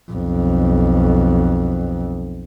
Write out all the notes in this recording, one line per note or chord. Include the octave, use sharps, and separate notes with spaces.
B1 F2